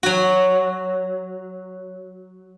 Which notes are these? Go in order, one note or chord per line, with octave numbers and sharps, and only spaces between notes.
F#3 F#4